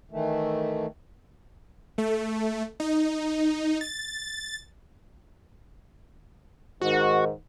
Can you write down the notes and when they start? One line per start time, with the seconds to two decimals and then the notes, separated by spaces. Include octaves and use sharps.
0.12 D#3 E3 A3
1.98 A3
2.80 D#4
3.81 A6
6.82 G#2 D#3 F#4